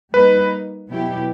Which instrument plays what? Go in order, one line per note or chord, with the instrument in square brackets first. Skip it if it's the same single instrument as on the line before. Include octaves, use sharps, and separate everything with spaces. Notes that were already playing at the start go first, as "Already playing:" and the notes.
[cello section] G3 A#3 D#4 [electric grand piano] B4
[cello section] B2 F#3 B3 E4 G4